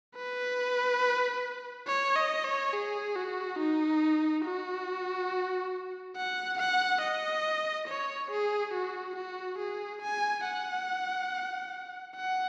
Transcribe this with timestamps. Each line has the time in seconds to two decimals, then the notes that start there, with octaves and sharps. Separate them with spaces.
0.16 B4
1.87 C#5
2.16 D#5
2.45 C#5
2.74 G#4
3.16 F#4
3.59 D#4
4.45 F#4
6.17 F#5
6.59 F#5
7.02 D#5
7.88 C#5
8.31 G#4
8.74 F#4
9.16 F#4
9.59 G#4
10.03 G#5
10.45 F#5
12.17 F#5